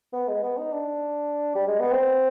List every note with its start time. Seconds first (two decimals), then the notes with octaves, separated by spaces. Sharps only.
0.13 B3
0.28 G#3
0.42 B3
0.58 D#4
0.72 D4
1.55 G3
1.68 G#3
1.80 B3
1.92 C4